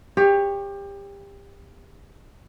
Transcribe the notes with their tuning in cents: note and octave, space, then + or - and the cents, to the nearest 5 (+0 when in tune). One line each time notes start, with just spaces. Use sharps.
G4 +25 C#5 +0